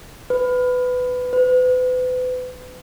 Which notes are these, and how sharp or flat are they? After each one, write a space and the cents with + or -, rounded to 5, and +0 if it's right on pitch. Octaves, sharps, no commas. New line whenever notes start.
B4 +15
B4 +35